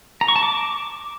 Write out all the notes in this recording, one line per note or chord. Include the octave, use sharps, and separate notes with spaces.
A#5
C#6
A5
D6